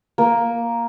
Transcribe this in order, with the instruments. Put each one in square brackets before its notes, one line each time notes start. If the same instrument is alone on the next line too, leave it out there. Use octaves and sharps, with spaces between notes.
[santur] A#3